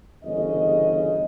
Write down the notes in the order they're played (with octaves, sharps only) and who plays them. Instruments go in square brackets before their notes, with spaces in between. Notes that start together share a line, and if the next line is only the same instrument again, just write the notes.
[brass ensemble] G1 E2 C#3 D#5